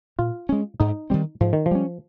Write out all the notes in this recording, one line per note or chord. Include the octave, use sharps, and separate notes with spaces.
A#2 F4
G#3 C#4
G#2 D#4
D#3 G3 C4
G#2 F3
D#3
F3
G3 C#4